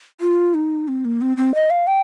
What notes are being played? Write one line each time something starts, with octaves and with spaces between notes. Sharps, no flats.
F4
D#4
C4
A#3
C4
C4
D#5
F5
G5